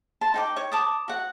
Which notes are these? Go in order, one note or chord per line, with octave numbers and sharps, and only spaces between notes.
A5 C6
D#4 G5 D6
C#5
A5 D6 D#6
F#4 F#5